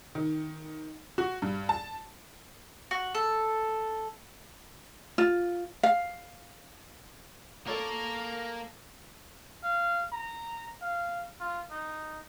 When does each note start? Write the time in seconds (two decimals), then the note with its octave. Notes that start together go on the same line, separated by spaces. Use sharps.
0.15 D#3
1.18 F#4
1.42 G2
1.69 A5
2.91 F#4
3.15 A4
5.18 F4
5.83 F5
7.67 A#3 A4 A#4 D5 C#6
9.63 F5
10.12 A#5
10.82 F5
11.40 F4
11.71 D#4